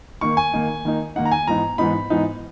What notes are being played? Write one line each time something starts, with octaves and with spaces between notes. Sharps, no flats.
D#3 A#3 D#4 C#6
G#5
D#3 A#3 D#4
D#3 A#3 D#4
D#3 A#3 D#4 F#5
A#5
G#5
G#2 E3 B3 D#4 A#5
G#2 E3 B3 D#4 B5
G#2 E3 B3 D#4